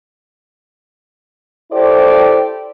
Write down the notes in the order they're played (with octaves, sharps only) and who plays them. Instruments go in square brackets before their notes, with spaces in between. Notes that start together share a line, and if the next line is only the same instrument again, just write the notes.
[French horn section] E4 G4 A4 C5 D5